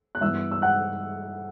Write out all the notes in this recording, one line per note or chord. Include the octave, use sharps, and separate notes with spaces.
F#6
G2 E3 B3 E5 E6
E6
F#5 F#6